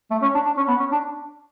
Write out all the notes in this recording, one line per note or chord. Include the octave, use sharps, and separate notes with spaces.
A3
C#4
D4
D4
C#4
B3
C#4
D4